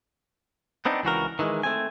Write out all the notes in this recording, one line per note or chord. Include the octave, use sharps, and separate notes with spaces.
B3 C4 D4 D#4
C#2 E3 F#4 A#4
D#3 E3 F#3 G#3
A3 C4 G#5